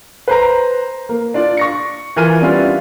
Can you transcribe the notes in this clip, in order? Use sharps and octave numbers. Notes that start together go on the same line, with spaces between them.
B4 C5 A#5
A#3
D4 F4 D5
C#6 A#6 C#7
E3 F4 A#4 G#5 F6 D#7
G3 B3 C#4 D4 E4 F4